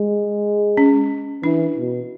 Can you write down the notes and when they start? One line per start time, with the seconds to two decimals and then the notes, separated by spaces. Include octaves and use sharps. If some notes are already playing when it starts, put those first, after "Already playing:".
Already playing: G#3
0.77 C#4
1.43 E3 D4
1.77 B2